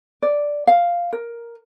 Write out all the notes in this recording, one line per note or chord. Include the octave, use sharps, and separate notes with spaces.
D5
F5
A#4